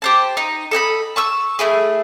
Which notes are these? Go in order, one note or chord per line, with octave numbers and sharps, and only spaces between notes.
G4 C5 A5
D#4
A4 D#5 G5 B5
A5 C#6 E6
A3 D#4 E4 G#4